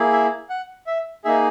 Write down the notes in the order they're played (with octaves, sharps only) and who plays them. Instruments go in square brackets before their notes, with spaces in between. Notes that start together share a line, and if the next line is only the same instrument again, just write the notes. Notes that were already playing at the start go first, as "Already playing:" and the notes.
Already playing: [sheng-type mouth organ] A#3 E4 G#4
E5
F#5
E5
A#3 D#4 G#4 E5